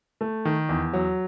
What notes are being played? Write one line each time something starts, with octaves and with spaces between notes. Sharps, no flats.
A3
D#3
E2
F#3